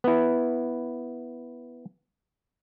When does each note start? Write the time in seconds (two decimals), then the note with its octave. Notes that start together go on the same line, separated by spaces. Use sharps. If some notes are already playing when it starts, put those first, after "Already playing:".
0.04 B3 E4